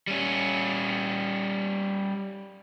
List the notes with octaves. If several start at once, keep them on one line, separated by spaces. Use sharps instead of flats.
G3 C#4